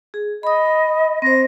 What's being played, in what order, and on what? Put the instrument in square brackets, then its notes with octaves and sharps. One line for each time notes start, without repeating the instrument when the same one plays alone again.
[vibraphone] G#4
[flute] D#5 [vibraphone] B5 D#6
[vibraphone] C4 C5 [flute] A#6